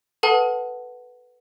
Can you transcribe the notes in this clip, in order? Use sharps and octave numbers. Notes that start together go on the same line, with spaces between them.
A4 B4 F#5 A5